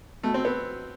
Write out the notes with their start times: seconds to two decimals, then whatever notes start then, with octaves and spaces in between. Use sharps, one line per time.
0.23 B2 A3
0.34 C4
0.45 B3